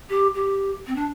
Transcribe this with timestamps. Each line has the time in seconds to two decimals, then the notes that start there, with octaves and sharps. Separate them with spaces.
0.09 G4
0.35 G4
0.87 C4
0.96 D4